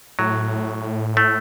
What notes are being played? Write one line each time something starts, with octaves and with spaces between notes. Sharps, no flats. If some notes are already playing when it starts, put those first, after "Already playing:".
A2 F#3
A3